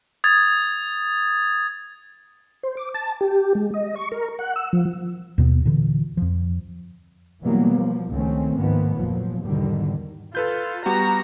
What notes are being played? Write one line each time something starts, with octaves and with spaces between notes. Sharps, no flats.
D#6 G#6 A6
C5
D6
A5
G4
G#3
D#5
C#6
A#4
F#5
E6
F3
D#2 B2 G3 B3
A#2 D3 E3
F2 F3
B2 E3 F#3 G3 A#3 B3
F3
C#2 D#3 A3 C4 C#4
G#2 D#3 F3 A#3 B3
F1 A#2 F3 F#3
E2 G#2 B2 D3 D#3 G3
F4 A4 B4 G6
G3 B3 F#4 A#5